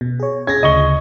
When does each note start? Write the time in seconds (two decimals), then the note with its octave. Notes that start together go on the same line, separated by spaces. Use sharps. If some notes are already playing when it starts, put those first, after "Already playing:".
0.01 B2
0.20 G#4 C#5
0.47 C#4 G#4 G#6 A#6
0.63 D2 C#3 D#5 C#6 G7